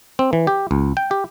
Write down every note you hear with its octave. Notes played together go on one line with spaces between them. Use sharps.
C4
E3
G4
C#2
G5
G4